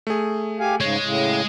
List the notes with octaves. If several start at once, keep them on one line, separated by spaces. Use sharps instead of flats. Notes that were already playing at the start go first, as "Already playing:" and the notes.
A3 G#4
G4 F5 G#5
G#2 C#3 G#3 C#5
A2 C#3